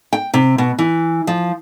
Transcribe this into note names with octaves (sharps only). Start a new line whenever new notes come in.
G5
C3
B2
E3
F3